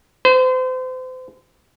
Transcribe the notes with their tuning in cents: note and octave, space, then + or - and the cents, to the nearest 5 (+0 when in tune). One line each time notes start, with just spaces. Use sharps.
C5 -35